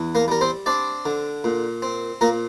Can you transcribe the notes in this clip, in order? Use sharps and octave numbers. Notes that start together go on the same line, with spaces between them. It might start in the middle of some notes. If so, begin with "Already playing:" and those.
Already playing: E2
A#3 A#4
G3 A#4
C4 C5
C4 D4 D5
D3
A#2
C4
A#2 A#3 A#4